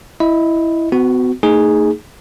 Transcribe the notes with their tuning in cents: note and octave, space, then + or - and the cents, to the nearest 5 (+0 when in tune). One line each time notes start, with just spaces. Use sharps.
E4 +0 D#5 +5
B3 +45 F#4 +0
A3 +45 D#4 +0 G#4 +0